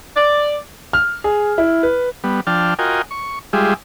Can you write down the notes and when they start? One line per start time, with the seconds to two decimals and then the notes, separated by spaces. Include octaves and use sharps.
0.16 D5
0.93 F6
1.24 G#4
1.58 E4
1.83 B4
2.24 G3 B3
2.47 F3 D4 G5 A5 F6
2.79 F4 F#4 A#4 D#5 G5 G#5
3.11 C#6
3.53 G3 G#3 F4 G4 G#4 E5